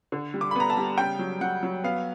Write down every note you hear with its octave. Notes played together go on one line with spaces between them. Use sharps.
D3
G3
D6
B5
B3 A#5
A5
G3
C#3 G5
F#3
F#3 F#5
F#3
B3 F5